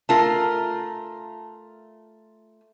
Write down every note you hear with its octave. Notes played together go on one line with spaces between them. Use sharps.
A3 F4 A#4